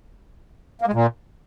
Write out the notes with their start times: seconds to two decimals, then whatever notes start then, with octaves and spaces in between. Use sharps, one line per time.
0.82 A#3
0.87 G#3
0.93 A#2